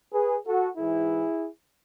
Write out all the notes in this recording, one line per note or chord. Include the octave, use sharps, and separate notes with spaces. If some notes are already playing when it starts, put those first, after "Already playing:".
G#4 B4
F#4 A4
G#2 E3 E4 G#4